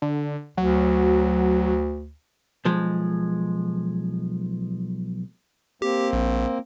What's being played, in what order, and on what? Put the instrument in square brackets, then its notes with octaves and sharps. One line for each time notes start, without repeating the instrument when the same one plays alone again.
[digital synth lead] D3
[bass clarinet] D2 [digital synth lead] F#3
[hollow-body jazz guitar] B1 F3 G#3
[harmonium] A#3 C4 [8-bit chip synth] G4
[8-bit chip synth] A#1